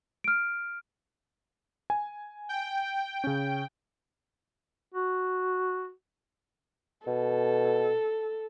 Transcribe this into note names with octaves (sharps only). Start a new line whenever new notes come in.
F6 D7
G#5
G5
C#3 C#4
F#4
B2 A4